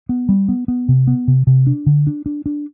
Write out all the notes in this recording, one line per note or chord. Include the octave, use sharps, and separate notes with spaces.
B3
G3
B3
B3
C3
B3
C3
C3
D4
D3
D4
D4
D4